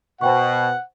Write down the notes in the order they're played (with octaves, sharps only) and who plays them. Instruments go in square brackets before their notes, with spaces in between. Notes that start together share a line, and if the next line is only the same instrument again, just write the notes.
[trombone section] B2 [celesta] C5 G5 C#6 [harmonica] F#5